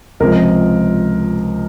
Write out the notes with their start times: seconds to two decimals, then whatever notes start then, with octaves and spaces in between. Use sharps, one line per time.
0.20 C#2 C3 F3 A#4